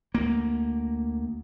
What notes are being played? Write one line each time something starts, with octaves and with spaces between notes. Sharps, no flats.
D2 A#3